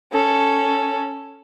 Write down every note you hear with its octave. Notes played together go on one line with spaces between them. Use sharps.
C#4 A4